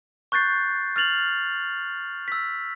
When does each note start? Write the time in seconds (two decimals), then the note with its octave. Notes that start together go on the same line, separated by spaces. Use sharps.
0.32 C#6 F#6 G6 A6 C7
0.96 F6 A6 F7 F#7
2.28 E6 B6